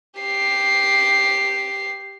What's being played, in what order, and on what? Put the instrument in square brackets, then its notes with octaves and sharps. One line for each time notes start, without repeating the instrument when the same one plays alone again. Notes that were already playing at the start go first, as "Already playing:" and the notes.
[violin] G4 C7